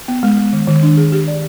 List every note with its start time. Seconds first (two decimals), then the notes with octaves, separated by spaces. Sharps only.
0.08 B3
0.23 G#3
0.37 G#3
0.53 D#3
0.68 D#3
0.83 D4
0.97 G#4
1.12 G4
1.28 D5